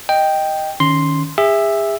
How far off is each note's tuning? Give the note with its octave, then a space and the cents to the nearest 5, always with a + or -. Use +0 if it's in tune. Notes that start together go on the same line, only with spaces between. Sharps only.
D#5 +0 G5 +0
D#3 +0 C#4 +10 C6 +0
G#4 -35 E5 +0